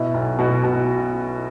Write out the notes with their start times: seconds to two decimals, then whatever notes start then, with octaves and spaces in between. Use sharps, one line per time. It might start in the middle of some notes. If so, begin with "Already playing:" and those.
Already playing: B2 E4
0.14 B1
0.39 B2 F#4
0.64 B2 F#4